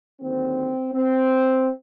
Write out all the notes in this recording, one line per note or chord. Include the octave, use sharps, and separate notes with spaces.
D#2 D3 F#3 C4
C4